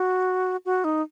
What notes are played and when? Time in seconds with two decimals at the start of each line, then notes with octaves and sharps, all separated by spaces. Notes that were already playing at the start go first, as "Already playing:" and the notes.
Already playing: F#4
0.65 F#4
0.84 D#4